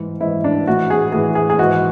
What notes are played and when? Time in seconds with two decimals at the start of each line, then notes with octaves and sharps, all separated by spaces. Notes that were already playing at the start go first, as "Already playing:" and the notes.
Already playing: G#2 E3
0.21 G#2 E3 E4
0.44 D4
0.67 A2 E3 F#4
0.90 G#4
1.12 A2 E3 G#4
1.35 G#4
1.50 G#4
1.59 G#2 E3 F#4